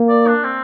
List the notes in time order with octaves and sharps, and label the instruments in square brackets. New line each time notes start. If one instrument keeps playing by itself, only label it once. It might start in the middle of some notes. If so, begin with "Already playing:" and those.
Already playing: [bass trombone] A#3
[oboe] D5
D4
C4